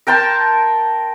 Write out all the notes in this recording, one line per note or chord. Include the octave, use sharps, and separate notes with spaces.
A#4 G5 A5 C6